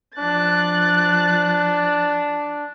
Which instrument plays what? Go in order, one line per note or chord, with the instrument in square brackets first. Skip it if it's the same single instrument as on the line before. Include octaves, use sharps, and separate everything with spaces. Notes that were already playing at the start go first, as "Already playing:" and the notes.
[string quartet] F3 F#6 A6 [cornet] D4